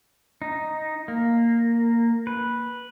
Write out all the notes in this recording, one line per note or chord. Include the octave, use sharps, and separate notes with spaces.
D#4
A#3
B4